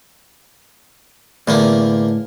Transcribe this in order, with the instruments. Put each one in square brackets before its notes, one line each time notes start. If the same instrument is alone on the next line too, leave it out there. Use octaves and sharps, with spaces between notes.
[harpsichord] E2 D3 A#3 [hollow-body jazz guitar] A2